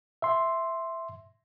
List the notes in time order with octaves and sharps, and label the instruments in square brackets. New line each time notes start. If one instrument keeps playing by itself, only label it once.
[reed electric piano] E5 C6